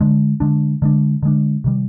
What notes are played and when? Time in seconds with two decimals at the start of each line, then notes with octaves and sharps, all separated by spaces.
0.01 D3 G#3 D4
0.40 D3 G#3 D4
0.82 D3 G#3 D4
1.23 D3 G#3 D4
1.64 C3 D#3 G3